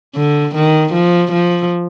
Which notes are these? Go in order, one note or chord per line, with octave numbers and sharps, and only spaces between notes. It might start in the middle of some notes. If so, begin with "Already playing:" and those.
D3
D#3
F3
F3